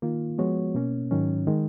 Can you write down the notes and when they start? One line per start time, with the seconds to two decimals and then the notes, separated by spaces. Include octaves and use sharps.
0.02 D#3 A#3 F4
0.38 F3 G#3 B3 F#4 C#5
0.75 B2 A#3 C#4
1.11 G#2 D#3 F#3 C#4
1.47 D#3 G#3